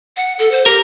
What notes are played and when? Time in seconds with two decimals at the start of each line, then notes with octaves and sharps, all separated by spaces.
0.17 F#5
0.39 A4
0.51 C5
0.66 G4 A#4